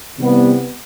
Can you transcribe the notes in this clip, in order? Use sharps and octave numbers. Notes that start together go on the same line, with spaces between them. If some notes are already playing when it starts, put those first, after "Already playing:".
C3 E3 G3 B3